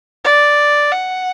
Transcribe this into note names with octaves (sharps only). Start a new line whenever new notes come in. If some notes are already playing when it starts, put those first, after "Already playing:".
D5
F#5